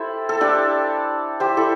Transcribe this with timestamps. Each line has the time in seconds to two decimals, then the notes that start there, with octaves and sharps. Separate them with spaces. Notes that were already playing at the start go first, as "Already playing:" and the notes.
Already playing: E4 G4 A4 C5
0.29 A4
0.41 D4 G4
1.40 G4 C5
1.57 E4 A4